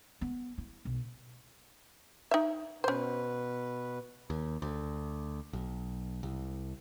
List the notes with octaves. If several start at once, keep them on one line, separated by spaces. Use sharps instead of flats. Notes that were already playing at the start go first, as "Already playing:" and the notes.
B3
E4
B1
D#4 E5
B2 C#4 B4 C5
D#2
D2
B1
C2